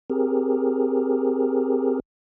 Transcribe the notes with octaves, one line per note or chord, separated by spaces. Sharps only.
C4 G4 G#4 A#4